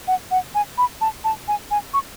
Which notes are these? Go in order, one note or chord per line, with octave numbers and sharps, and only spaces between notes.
F#5
F#5
G#5
B5
A5
A5
G#5
G#5
C#6